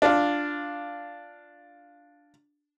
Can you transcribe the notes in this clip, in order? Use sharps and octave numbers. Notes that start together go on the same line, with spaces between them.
D4 F4